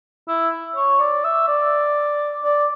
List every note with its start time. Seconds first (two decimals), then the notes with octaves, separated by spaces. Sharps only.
0.28 E4
0.76 C#5
1.00 D5
1.24 E5
1.48 D5
2.44 D5